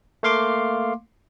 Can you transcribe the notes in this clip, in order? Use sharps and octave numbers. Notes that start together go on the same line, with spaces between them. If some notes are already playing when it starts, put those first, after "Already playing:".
A3 A#3 F5 C6 D6